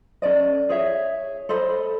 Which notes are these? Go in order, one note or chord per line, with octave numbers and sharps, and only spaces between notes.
C#4 A4 D5 D#5
G#4 C#5 E5
A4 C5 D#5 B5